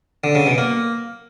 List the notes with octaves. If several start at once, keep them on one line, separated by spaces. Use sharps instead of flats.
D3
C#3
B2
A#3